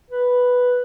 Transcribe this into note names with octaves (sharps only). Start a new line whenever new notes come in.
B4